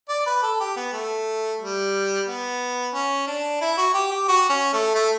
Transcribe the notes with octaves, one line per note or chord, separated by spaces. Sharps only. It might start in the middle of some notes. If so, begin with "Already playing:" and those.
D5
B4
A4
G4
B3
A3
G3
B3
C#4
D4
E4
F#4
G4
G4
F#4
C#4
A3
A3